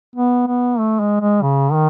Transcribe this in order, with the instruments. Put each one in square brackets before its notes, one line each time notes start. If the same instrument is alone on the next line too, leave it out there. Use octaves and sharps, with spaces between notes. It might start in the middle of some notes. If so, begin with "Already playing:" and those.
[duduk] B3
B3
A3
G#3
G#3
C#3
D#3